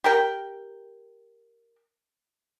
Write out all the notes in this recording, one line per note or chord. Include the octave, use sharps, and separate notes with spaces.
G4 A#4 G5